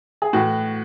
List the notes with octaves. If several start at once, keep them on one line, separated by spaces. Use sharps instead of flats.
G#4
A2 E3 F#4